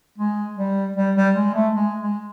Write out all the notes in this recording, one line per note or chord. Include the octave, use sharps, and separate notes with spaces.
G#3
G3
G3
G3
G#3
A3
G#3
G#3